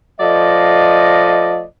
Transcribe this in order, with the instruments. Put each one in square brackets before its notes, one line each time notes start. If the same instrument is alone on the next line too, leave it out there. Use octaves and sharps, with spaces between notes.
[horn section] F3 A3 D5 D#5